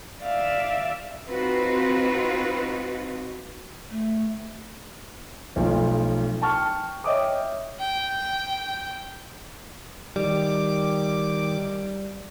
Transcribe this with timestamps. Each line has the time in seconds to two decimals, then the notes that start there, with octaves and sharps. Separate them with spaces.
0.23 D5 E5 F5
1.27 C4 D#4 F4 F#4 B4
3.91 A3
5.56 B1 F3 A3
6.42 G5 A5 C#6 F6
7.04 C#5 D#5 E5 G5 D6 D#6
7.79 G5
10.16 D#3 G3 D6